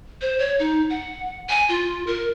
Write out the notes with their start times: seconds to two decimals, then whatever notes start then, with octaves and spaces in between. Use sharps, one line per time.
0.21 C5
0.39 C#5
0.59 D#4
0.90 F#5
1.49 G#5
1.69 F4
2.07 A#4